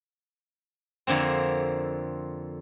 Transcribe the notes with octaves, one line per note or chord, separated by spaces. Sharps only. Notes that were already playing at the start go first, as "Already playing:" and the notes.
F2 D3 A#3 C4